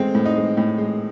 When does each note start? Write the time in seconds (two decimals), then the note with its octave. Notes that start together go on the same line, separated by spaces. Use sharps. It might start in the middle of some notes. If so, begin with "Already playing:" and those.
Already playing: G#3 A3 C4
0.15 A2
0.25 D#4
0.36 G#3
0.57 A2
0.78 G#3